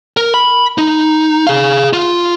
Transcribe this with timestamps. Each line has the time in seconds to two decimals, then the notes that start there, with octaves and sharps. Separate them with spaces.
0.17 A#4
0.34 B5
0.78 D#4
1.47 G#4 F5
1.93 F4